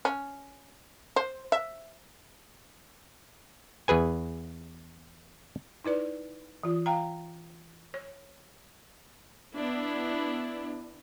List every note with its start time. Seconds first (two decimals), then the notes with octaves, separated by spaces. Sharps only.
0.05 C#4
1.16 C5
1.52 E5
3.88 E2 G#4 B4 G#5
5.84 D#4 E4 B4 D5
6.63 E3 F4
6.86 F5 G5 A#5
7.94 C#5
9.56 B3 D4 E4